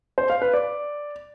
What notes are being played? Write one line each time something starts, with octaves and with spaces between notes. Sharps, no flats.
C5
F5
B4
D5